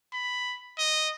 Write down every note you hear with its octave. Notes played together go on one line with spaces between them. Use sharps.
B5
D#5